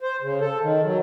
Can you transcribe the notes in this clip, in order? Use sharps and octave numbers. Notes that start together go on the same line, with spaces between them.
C5
C#3
A4
D#3
F#3